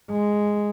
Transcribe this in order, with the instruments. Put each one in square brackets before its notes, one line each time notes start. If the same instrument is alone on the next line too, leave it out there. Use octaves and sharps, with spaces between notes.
[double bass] G#3